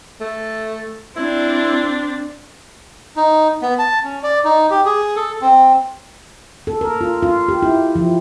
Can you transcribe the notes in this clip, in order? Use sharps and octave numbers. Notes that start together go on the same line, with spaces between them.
A3
C4 D4 E4
D#4
B3
A5
C#4
D5
D#4
G4
G#4
A4
C4
A4
A#4
F4
F4
G4
E4
F3